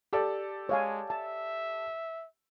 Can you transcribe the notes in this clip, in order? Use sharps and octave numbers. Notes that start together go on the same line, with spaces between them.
G4 A4 D5
G#3 C#5 F5 G#5
E5 A5